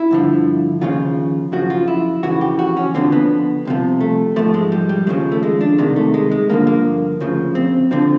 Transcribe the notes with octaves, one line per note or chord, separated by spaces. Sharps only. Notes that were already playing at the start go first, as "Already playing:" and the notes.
Already playing: E4
G2 D3 F3
D#2 C#3 F3 F4
F#2 C#3 F3 F#4
F4
E4
F2 C#3 E3 F#4
G4
F#4
C#4
F2 D3 F3 C4
B3
C2 C3 F3
A3
G#2 F3 A3
G#3
G3
G3
D#2 C#3 F3 G#3
A3
G#3
D4
C2 C3 D#3 G#3
A3
G#3
G#3
G2 D3 F3 A#3
A#3
D2 C#3 F3
C4
D3 F3 C4